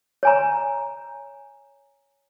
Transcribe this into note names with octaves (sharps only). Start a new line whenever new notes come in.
C#5 G#5 A#5